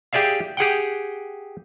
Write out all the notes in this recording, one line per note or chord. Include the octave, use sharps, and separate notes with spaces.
G4 G#4 D5 E5 F5
G4 G#4 F#5 G5